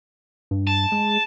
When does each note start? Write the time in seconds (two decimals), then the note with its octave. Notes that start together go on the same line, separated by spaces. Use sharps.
0.51 G2
0.67 A5
0.92 G#3